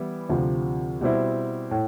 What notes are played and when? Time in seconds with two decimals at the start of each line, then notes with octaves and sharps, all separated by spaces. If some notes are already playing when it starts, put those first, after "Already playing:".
Already playing: E3 G3 B3 E4
0.30 D2 C3 F3
1.01 B2 G3 C4 E4
1.71 A2